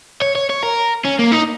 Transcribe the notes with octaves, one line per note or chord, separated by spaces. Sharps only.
C#5
C#5
C#5
A#4
C#4
A#3
D#4